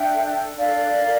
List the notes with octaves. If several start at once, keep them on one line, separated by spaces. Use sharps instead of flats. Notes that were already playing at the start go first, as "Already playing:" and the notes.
Already playing: D4 E5 G5
A4
D4 D5 F5
A#4